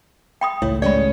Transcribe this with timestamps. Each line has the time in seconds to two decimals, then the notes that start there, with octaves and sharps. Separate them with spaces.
0.41 G5 B5 D#6
0.62 G#1 C#2 A2 E4 C#5
0.82 G#3 C#4 C#5 D5 B5